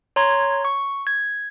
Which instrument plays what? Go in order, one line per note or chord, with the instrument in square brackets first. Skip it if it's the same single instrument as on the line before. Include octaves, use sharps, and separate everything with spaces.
[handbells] C#5 A#5 C6 G#6
C#6
G#6